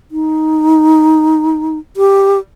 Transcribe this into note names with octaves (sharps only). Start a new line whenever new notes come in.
D#4
G4